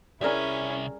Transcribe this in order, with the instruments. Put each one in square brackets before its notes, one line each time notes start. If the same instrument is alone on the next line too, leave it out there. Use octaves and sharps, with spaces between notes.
[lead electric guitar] C2 E5 [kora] G3 G#4 A#4 [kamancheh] C#4 E4